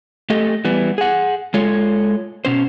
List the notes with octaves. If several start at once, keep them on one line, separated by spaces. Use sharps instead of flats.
A3 G4 A4 D#5
E3 G3 B3
G#4 F#5
G#3 F4 A4 C#5
B2 C#4 C5